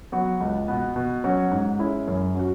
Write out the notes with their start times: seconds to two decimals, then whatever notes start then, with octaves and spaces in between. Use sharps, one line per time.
0.12 F#3 B3 F#4
0.40 C#2
0.68 B2 B3
0.96 B2
1.24 F#3 C#4 F#4
1.51 G#2
1.79 G#3 C#4 E4
2.08 F#2
2.35 F#3 C#4 F#4